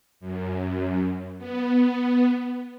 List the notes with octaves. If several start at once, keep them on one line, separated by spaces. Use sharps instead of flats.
F#2
B3